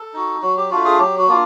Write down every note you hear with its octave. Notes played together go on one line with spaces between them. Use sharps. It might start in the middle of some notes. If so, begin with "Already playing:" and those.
Already playing: A4
D#4 F#4
F#3 F#4
G4
A3 D4 F4 F#4
G#4
F#3 G4
F#4
A#3 D4 F4